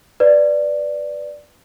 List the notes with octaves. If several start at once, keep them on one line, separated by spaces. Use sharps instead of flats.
B4 D5